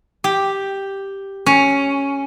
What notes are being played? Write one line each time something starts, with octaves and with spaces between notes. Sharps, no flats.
G4
C#4